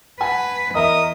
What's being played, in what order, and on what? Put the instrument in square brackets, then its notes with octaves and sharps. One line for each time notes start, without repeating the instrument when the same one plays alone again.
[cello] B4 [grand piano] F#5 G#5 A5
[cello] E2 [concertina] A#4 [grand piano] D#5 E5 B6 [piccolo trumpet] D#6